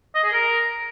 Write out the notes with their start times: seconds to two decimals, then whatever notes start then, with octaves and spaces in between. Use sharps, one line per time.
0.15 D#5
0.24 G#4
0.33 A#4